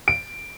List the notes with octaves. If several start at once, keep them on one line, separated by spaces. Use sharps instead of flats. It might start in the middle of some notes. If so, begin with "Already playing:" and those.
D7